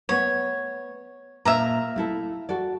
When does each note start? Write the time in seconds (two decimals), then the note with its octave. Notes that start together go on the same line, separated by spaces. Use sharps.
0.09 A3 B3 C#5
1.45 A#2 E5 F5 A#5
1.96 A3 E4 A4
2.49 F#4 A4 D5